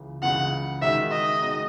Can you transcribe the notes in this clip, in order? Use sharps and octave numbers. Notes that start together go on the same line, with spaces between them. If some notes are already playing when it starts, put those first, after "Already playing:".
Already playing: C#2 C#3 E3
C#2 C#3 E3 F#5
D#3 G#3 D#4 F#4 E5
D#5
D#3 G#3 D#4 F#4